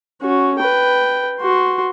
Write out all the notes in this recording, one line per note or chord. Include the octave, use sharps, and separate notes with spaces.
C#4 F#4
B4 G5
F#4 C6